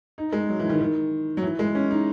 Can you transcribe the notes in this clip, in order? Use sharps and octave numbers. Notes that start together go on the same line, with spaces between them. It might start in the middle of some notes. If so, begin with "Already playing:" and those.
D#4
G#3
F#3
E3
D#3
D#3
F#3
E3
G#3
C#4
D#4